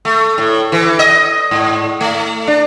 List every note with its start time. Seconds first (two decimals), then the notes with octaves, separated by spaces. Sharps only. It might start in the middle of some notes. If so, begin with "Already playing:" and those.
0.05 A3
0.38 A2
0.72 E3
0.99 D#5
1.51 G#2
2.01 A3
2.47 D4